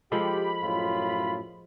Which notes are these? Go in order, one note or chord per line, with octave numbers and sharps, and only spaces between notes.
F3 G#3 G4 A4 B5
F#2 A2 F4